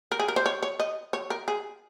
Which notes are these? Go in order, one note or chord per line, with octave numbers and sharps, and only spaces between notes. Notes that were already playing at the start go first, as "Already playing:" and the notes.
A#4
G#4
A#4
C5
C#5
C#5
D#5
C#5
A#4
G#4